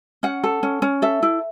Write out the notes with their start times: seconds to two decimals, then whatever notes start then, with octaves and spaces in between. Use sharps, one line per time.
0.23 C#4 F#5
0.44 A4
0.63 C#4
0.82 C#4
1.02 A4 E5
1.23 E4